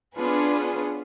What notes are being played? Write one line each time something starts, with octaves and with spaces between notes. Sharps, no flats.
B3 C#4 D4 F4 G#4 B4